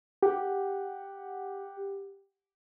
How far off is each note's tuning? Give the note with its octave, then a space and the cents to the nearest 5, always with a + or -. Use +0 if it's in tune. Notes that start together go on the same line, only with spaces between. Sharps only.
G4 +5 F#5 +0